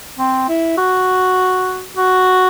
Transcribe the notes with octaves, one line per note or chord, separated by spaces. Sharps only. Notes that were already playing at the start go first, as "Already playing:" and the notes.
C4
E4
F#4
F#4